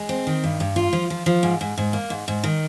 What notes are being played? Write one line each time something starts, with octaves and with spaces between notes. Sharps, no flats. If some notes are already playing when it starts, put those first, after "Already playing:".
Already playing: G#3
C4
D#3
G2
G2
F4
F3
F3
F3
G#2
G#2
G#2
A#3
G#2
G#2
D#3